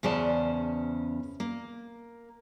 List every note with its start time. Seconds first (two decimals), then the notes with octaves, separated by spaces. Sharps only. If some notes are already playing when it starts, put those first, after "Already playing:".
0.03 E2 C#3 C#4 C5 D5 A5
1.40 A#3